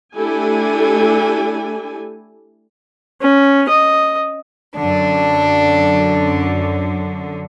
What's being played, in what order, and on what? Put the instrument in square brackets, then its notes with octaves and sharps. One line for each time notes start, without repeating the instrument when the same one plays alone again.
[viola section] A3 D4 E4 G4 A4 G#5
[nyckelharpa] C#4
D#5
[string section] F#2 D3 [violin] D4